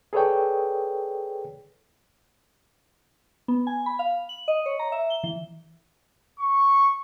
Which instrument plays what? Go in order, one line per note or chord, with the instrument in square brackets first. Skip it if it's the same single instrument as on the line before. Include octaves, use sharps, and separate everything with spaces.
[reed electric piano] G#4 A4 B4 C#5 D5 G5
[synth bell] B3
G#5
B5
F5
F#7
D#5
C#5
A#5
E5
G7
E3
[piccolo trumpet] C#6